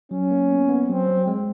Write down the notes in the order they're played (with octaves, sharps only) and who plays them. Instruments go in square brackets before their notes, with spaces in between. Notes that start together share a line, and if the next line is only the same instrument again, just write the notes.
[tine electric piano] F#3 [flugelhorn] C#4
[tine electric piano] A#3
B3
B3
[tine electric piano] F#3 [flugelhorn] C4
[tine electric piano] F#3
G#3